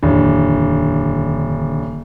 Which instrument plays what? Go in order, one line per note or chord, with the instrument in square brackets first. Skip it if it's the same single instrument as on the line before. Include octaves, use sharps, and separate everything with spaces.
[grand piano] D#1 [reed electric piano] F2 E3 D4 [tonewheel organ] D3